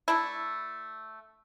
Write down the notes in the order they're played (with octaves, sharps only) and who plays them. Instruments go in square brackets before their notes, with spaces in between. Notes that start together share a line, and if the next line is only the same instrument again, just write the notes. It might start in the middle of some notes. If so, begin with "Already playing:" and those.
[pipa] A3 D4 E4